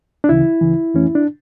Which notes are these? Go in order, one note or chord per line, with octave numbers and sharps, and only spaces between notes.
D4
D2 C#3 E3 E4
D2 C#3 E3
F2 E3 A3 C#4
D4